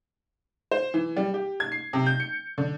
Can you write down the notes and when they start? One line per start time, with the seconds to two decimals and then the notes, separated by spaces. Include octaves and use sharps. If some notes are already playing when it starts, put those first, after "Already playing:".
0.71 C5
0.94 E3
1.17 G3
1.34 G4
1.60 G#6
1.72 C7
1.93 C3
2.06 G6
2.20 C#7
2.58 D3